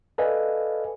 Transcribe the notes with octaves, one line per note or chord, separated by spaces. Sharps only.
A4 B4 D5 D#5 F5 G#5